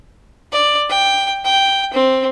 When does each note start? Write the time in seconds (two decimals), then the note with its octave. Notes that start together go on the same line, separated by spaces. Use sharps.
0.52 D5
0.90 G5
1.45 G5
1.93 C4